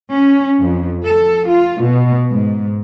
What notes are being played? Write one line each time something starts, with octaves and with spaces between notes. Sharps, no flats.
C#4
F2
A4
F4
B2
G#2